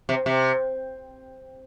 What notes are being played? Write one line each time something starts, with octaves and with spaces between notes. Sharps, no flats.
C3
C3